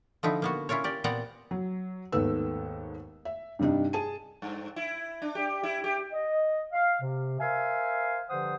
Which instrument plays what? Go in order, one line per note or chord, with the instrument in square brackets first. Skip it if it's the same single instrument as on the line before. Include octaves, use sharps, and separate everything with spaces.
[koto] D3 F3 D#4 E4
A#3 B3 F#4
C#4 E4 F4 A#4 C#5
G4 A#4 D5
A#2 B3 C4 D5 F#5 A#5
[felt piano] F#3
D#2 G#2 A3 B3 E6
E5
G2 C3 G3 D4 D#4
G#4 A5 D#7
[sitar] G2
E4
D4
G4
E4
G4
[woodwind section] D#5
F5
C3
A#4 C5 E5 F5 G#5
G2 D3 F3 C5 F#5 D#6